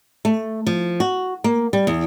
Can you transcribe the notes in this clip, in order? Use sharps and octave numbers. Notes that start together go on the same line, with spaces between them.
A3
F3
F#4
A#3
G3
E2